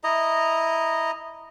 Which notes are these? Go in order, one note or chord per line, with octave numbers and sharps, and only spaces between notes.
E4 D#5 A#5